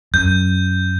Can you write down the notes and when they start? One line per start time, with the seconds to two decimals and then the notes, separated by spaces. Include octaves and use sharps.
0.14 F#2 G6